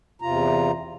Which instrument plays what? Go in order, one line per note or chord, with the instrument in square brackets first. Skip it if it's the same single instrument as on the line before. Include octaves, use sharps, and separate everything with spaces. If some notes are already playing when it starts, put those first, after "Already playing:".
[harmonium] E2 C3 F4 A#5